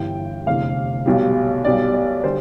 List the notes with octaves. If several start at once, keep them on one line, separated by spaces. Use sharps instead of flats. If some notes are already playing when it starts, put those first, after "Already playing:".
Already playing: G1 G2 E3 G5
F1 E2 D3 F5
B1 B2 G3
B1 B2 G3 D5
D5
D3 G3 C5